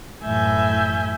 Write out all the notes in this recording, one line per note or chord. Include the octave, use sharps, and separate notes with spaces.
F#2 A2 E3 E5 G#5 G6